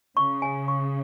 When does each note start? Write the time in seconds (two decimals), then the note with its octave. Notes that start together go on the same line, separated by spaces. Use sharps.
0.16 C#3 C#6
0.42 G#5
0.68 C#6